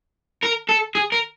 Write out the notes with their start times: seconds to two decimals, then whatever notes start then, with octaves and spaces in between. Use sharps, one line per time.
0.44 A#4
0.69 A4
0.95 G#4
1.12 A#4